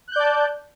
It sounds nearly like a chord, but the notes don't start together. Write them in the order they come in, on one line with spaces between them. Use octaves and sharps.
F#6 G6 D5 A5